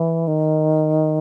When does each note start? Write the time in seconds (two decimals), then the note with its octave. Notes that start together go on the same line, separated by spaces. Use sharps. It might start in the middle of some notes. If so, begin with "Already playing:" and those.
Already playing: E3
0.28 D#3